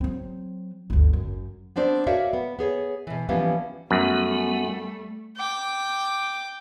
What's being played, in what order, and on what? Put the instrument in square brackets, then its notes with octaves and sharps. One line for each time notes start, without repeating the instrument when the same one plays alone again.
[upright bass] F#3 C4
G1 D2
F#2
[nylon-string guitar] B3 C4 D4 C5 D5
F#4 A#4 C#5 D5 E5 F5
B3
B3 G#4 C#5
B2 E3
E3 F3 G3 A#3 B3 C#4
[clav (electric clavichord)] F#2 [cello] G3 A3 [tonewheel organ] B3
[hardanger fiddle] G5 D6